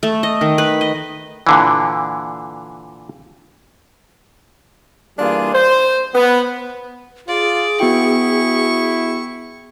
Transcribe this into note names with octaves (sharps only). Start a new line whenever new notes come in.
A3
D#5
D#3
B4
D#5
A#2 D3 E3
E3 G3 A#3 D4 F4 G#4
C5
B3
F4 G#4 D5
B3 E4 F#4 G5 C#6